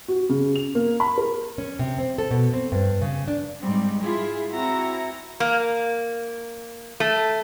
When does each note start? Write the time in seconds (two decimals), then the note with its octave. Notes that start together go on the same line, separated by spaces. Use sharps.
0.08 F#4
0.29 C#3
0.56 F7
0.75 A#3
1.00 B5
1.18 A#4
1.58 C#4
1.79 C3
1.98 C4
2.18 A4
2.31 B2
2.53 C4
2.72 G2
3.01 C#3
3.28 D4
3.61 G#2 G3 C4
4.01 E4 F4 G#4
4.51 C4 E4 F#4 A#5
5.40 A#3
7.00 A3